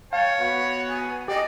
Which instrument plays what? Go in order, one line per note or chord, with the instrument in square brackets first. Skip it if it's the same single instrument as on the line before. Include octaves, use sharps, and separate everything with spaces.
[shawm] C#5 [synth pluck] F5 [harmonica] G5 A5
[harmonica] B3 F#4
[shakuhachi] G#5
[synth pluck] G4 [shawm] D5 [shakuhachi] D#5